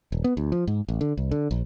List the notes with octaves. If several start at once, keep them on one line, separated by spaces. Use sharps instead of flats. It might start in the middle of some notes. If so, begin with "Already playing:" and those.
D#1
B3
D2
F3
G#2
A1
D3
C2
D3
A#1